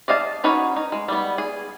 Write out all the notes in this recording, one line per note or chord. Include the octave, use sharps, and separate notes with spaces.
D5 D#5 F5 G#5 A5
C#4 D#4 F#4 B4 C#5
D#4
G#3
G3 B3
G#4